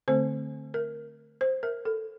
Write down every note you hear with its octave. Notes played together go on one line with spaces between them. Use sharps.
D3 A3 C4 C5
A#4
C5
A#4
A4